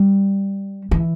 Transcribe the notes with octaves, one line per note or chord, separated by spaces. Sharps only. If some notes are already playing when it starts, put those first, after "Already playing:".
Already playing: G3
E3